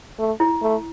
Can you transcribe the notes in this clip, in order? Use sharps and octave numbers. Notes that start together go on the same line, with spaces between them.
A3
E4
A3